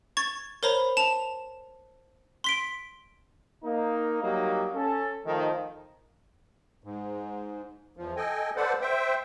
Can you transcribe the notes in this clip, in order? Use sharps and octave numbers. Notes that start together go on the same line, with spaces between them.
C#6 G#6 A6
A#4 C5 C#5 A#5 B5
A5 E7 F7
C6 B6 D7
A#3 D#4
F#3 G3 A#3 D#4
C#4 A4
D#3 F3 A3 D#4
G#2
E2 F3
A4 D#5 G5 G#5
A4 B4 C5 D5 F#5
C5 E5 G5